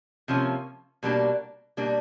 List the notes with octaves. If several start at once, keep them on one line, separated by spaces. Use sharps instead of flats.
C3 F3 A#3 C#4
B2 G3 A#3 D4
B2 G3 A#3 D4